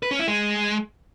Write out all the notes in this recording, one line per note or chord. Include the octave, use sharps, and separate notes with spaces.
B4
C#4
E4
G#3